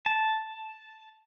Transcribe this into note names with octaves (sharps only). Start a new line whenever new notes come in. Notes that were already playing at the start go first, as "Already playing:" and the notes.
A5